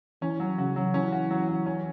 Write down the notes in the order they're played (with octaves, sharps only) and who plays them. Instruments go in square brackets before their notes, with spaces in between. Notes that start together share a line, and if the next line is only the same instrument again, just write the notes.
[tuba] E3 [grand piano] C#4
[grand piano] F#3
[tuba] C#3 [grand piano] F#4
[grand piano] F#3
[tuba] E3 [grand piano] C#4
[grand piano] F#4
F#3
F#3
C#4